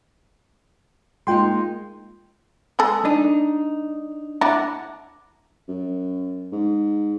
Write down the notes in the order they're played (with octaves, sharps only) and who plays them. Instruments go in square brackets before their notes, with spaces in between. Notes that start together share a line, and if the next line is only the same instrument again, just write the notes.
[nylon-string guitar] G#3 A#3 D#4 [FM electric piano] F4 G5 C6
[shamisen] G#3 G#4 A4
[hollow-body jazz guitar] D4 D#4
[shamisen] D4 E4 [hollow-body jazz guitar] F#5 A5 A#5
[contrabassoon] F#2
G#2